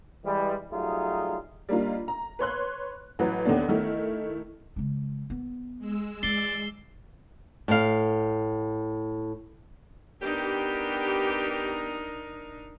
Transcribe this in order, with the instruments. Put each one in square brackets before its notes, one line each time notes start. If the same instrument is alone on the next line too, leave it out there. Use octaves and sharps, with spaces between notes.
[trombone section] E3 G3 G#3
F#3 G3 A3 D#4 F4 G#4
[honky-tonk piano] G3 A#3 D4 D#4 F4
A#5
B4 C#5 C6 F#6
A1 E3 F#3 B4
D#2 D3 B3 D4
D#3 A3 E4
[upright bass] C#3 G#3
B3
[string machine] G#3 E6
[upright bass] E3 C#4 [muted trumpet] D5 [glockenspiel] C7 G7
[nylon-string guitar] A2 F5
[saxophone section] B3 G4 [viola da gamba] D4 D#4 A#4